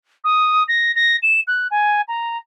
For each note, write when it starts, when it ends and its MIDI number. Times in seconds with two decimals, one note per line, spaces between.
0.24 0.63 87
0.68 0.92 94
0.95 1.16 94
1.22 1.40 100
1.47 1.67 90
1.71 2.01 80
2.08 2.37 82